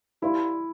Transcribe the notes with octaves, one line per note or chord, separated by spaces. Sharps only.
E4 G4 B4 D5 F5 C6